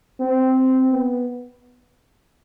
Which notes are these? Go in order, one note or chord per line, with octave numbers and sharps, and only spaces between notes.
C4
B3